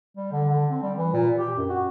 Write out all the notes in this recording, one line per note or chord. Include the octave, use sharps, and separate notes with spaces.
G3
D3
D3
C4
G3
E3
A#2
G4
F#2
F#4